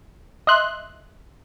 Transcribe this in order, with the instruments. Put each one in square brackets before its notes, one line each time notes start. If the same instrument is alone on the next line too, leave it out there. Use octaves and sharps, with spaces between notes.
[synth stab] D#5 E5 C6 F#6